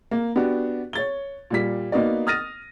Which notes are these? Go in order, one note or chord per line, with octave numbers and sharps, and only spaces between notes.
A#3
B3 D4 F#4 G4
C#5 A6 G7
A#2 G3 B6
A#3 B3 D#4 F#4 D5
D#6 F6 A6 A#6 D#7